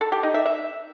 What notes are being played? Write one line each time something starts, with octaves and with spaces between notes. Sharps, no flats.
A4
G4
D#4
E5
E5